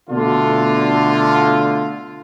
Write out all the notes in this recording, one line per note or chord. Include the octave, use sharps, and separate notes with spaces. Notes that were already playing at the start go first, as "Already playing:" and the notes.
B2 D3 A3 F4